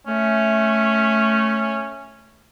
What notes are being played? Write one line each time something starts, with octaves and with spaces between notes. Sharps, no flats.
A3 C#4